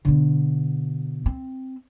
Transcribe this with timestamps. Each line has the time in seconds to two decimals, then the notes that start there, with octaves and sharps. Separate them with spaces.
0.05 B2 D3
1.26 C4